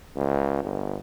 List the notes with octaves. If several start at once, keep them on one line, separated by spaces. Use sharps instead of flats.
C#2
G1